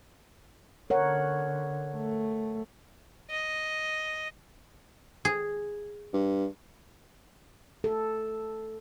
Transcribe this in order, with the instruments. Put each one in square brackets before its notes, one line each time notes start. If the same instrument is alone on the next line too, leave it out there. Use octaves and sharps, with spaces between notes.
[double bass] D3 [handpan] A#4 C#5 F#5
[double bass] A3
[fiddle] D#5
[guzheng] G#4
[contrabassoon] G2
[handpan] A4